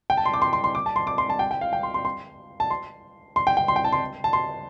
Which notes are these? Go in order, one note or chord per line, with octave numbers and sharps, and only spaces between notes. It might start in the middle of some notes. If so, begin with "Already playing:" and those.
G5
A5
C6
D6
C6
C6
C6
D6
A5
C6
D6
C6
A5
G5
G5
F5
G5
C6
C6
C6
A5
C6
C6
G5
G5
C6
G5
A5
C6
A5
C6